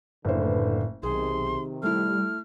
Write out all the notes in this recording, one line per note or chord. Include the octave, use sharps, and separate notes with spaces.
F#1 A2 D3 B4 C5
B1 C3 D#3 G#4 C6
G3 A3 E4 F6